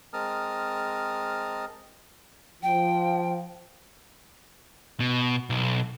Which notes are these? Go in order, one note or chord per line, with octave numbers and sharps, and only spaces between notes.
G#3 C4 A#4 A5 D#6 F6
F3 G5
B2
B1